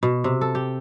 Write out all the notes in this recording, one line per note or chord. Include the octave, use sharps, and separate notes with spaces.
B2
C3
A4
G4